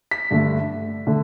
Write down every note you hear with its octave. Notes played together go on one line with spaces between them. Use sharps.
B6
G2 D3 A3
D3 A3